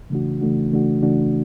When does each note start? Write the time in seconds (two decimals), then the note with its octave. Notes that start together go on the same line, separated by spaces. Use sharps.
0.10 C#3 E3 A3 D4 F#4
0.41 C#3 E3 A3 D4 F#4
0.72 C#3 E3 A3 D4 F#4
1.02 C#3 E3 A3 D4 F#4